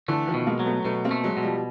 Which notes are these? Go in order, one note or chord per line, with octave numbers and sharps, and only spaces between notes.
D3 E3 A3
D#3 F3
B2
G#3 A#3
F#3
A3 B3
B2 A3 B3
A#3 C4
A3
F#3 G#3
B2
F3 G3